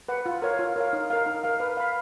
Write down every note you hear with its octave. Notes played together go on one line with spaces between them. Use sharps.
B4 F#5
F4
A#4 C#5 F5
F4
A#4 C#5 F5
D#4
A#4 F5
D#4
A#4 F5
B4
F5 B5